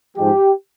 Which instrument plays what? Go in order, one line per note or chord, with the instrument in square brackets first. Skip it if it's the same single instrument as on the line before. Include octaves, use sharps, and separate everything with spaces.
[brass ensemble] G#2 F3 G#3 G4